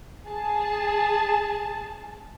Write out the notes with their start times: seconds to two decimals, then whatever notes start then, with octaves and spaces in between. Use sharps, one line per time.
0.26 G#4 A5